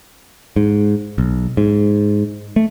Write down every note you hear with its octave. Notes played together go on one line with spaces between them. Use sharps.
G#2
B1
G#2
A3